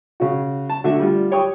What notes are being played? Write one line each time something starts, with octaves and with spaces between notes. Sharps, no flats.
C#3 F#4
A5
D3 A3 F#4 E5
G3 F4
G4 C#5 G5 C#6 D#6